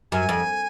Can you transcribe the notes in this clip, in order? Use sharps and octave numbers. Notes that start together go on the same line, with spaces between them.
F#2 G#5
F2